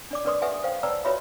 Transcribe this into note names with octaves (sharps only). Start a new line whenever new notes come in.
D4 D5 D6
D4 A#4 B4 D5 C6 D#6
G4 A4 B4 E5 F#5 G#5
C5 F5 G5
B4 D5 G5 A5 A#5 E6
F4 F#4 B4 C#5 E5 B5